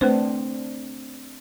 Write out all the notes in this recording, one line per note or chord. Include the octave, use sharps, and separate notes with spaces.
A3 C4 D4 B4 C5